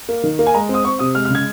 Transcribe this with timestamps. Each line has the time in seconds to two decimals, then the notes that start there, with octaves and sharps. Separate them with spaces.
0.09 A#3
0.23 D#3
0.39 A#3
0.47 G#5
0.54 G#3 A#5
0.69 C4
0.74 D#6
0.84 C4 C#6
0.99 C3 D#6
1.15 G#3 F6
1.25 F6
1.30 C#3 G#6